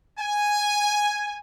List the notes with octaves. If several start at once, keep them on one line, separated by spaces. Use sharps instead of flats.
G#5